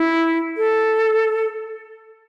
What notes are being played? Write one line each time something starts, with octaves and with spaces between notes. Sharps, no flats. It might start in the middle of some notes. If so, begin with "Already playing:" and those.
Already playing: E4
A4